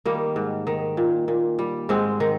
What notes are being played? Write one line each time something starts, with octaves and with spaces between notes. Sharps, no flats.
D#3 G3 A#3
G#2
D#3
A#2
A#2
G3
G#2 G#3 C4
D#3